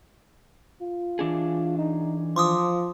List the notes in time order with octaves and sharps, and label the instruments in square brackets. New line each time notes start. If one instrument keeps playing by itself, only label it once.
[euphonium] F4
[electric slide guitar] E3 D4 G#4
[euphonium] D#4
[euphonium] F3 [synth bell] C6 D6 D#6